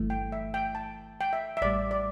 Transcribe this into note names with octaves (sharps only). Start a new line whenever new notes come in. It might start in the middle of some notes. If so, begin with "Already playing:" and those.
Already playing: G1 G2 E3 A3
G5
E5
G5
A5
G5
E5
E5
A1 A2 G3 D5
D5